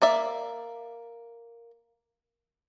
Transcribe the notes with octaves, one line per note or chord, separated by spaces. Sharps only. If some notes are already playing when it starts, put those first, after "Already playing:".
A#3 D5 E5